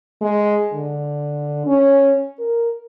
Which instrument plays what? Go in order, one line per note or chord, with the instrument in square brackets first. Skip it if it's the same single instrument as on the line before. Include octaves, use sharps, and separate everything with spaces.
[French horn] G#3
D3
C#4
A#4